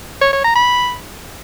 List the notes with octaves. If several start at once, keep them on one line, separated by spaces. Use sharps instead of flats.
C#5
C#5
A#5
B5